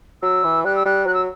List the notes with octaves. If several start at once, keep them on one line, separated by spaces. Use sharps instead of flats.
F#3 E6
E3
G3 F#6
E6
G3 F#6
F#3 F#6
E6